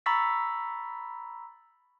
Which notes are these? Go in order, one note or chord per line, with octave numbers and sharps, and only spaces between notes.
A#5 B5 C#6 E6 A6 B6